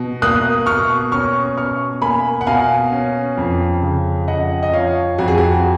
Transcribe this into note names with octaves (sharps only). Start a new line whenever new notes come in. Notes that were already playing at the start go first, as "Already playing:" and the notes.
Already playing: B2
A#3 D#6 F#6
B2 C#6 F6
C#4 C#6 F6
B2 C#6 F6
A#3 G#5 B5
F#5
B2 F5 G#5
C#4
F2
C#3
F2 D#5 F#5
D#5
F3 C#5 F5
F2 F#4
G#4
F#4